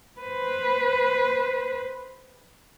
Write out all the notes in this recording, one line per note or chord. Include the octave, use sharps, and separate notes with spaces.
B4 C5